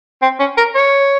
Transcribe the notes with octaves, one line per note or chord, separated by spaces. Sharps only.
C4
C#4
A#4
C#5